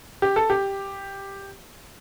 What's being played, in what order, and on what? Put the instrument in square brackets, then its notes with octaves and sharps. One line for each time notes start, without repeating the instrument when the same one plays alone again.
[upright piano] G4
A4
G4